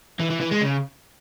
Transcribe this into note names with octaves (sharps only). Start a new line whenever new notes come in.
E3
E3
E3
G#3
C#3